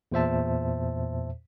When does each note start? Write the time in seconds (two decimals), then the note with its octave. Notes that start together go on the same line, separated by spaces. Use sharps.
0.12 E2 A#2 C5 E5 A5